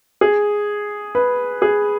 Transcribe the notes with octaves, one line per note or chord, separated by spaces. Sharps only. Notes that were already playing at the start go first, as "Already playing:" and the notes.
G#4
B4
G#4